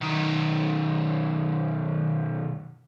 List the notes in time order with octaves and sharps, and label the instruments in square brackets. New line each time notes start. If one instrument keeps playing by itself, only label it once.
[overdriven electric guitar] B1 D#3